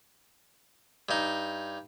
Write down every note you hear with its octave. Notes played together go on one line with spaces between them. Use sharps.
G2 D#4